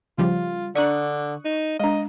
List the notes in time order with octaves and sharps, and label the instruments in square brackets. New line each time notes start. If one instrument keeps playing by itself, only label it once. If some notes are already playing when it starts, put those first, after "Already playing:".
[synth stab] C#3 F3 G3 [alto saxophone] F4
[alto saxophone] D3 [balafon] D4 D5 [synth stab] C#6 D#6 F#6
[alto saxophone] D#4
[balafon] G#3 D4 [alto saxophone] D#5